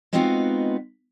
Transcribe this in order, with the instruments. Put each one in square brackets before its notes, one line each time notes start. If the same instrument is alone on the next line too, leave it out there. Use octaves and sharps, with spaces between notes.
[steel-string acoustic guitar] G#3 B3 C4 D#4 F4 F#4